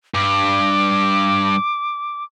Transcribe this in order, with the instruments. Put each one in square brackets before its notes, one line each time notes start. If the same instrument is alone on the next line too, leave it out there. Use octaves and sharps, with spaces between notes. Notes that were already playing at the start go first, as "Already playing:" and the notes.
[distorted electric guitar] G2 [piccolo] D6